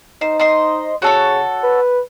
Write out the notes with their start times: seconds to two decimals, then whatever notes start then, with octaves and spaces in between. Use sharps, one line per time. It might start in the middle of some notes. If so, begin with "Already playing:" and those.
0.21 D#4 C5
0.39 C5 D#5 C6
1.02 C#3 F#4 A4 C#5
1.63 B4